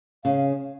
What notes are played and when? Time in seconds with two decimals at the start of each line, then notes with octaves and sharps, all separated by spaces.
0.25 C#3 F5